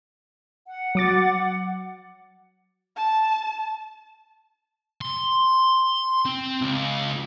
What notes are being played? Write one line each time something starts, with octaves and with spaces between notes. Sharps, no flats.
F#5
F#3 D6 A6
A5
C6
C4
C#2